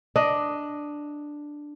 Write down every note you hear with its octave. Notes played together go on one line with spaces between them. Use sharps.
D4 D#5